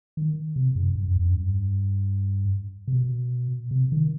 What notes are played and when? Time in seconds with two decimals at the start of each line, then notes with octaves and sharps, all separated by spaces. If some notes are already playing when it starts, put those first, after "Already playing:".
0.17 D#3
0.56 C3
0.75 F#2
0.95 G2
1.05 F#2
1.16 E2
1.25 F#2
1.35 G2
2.88 C3
2.93 B2
3.71 C3
3.92 D#3